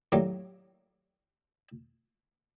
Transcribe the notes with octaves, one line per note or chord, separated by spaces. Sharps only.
A2 F#3 G3 A#3